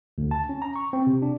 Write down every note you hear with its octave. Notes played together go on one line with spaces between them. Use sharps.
D2
A5
C#4
A#5
C#6
C4
C3
D4